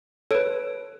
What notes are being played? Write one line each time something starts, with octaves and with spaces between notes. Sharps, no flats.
A4 B4 C#5 D7